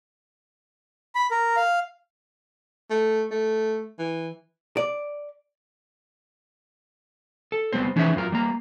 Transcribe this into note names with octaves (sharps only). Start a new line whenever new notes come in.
B5
A#4
F5
A3
A3
E3
D5
A4
G3 B3 C4 C5
E3 C#4 D#4 G#4 C5 E5
F#2 F4 A#4
G3 A#3 A#5